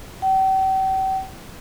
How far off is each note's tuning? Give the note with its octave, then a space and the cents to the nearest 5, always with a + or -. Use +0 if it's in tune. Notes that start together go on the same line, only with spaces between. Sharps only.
G5 -40